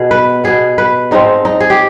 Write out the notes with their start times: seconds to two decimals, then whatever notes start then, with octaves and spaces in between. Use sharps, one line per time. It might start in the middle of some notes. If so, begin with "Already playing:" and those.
Already playing: B2 B3 G#4
0.11 B4
0.44 B2 B3 G#4
0.78 B4
1.11 G#2 F3 G#3 C4 D#4
1.45 D#4
1.60 G#4
1.70 G4